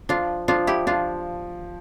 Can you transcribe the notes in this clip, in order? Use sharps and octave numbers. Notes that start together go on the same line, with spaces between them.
F3 D4 F4
F3 D4 F4
E4 G4
F3 D4 F4